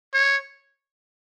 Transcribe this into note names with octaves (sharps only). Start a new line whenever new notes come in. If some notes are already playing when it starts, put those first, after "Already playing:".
C#5